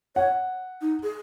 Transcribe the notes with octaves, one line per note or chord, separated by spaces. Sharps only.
C#5 F#5
D#4
G#4